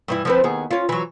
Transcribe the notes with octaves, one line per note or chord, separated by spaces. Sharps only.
G2 E3 E4
F3 C4 B4
D#2 B3 G#4
C#4 F4
E3 F#3